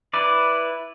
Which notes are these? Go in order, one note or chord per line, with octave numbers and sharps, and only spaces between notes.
E4 B4 D5